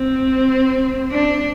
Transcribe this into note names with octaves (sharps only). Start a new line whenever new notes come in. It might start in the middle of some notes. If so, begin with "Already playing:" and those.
Already playing: C4
D4